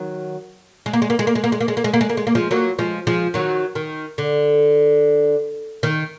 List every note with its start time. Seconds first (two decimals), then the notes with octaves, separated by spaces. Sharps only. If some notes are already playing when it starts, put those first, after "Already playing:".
Already playing: D#3 F#3
0.86 G#3
0.93 A#3
1.02 G#3
1.10 A#3
1.19 G#3
1.27 A#3
1.35 G#3
1.44 A#3
1.52 G#3
1.60 A#3
1.68 G#3
1.77 A#3
1.84 G#3
1.94 A#3
2.01 G#3
2.09 A#3
2.17 G#3
2.27 A#3
2.35 F3 G#3
2.51 F#3 A#3
2.79 F3 G#3
3.07 F3 G#3
3.34 D#3 F#3
3.75 D#3
4.18 D3
5.83 D#3